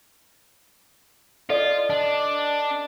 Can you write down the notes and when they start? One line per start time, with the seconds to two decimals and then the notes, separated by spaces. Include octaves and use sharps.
1.50 F4 A4 D5 D#5
1.90 D4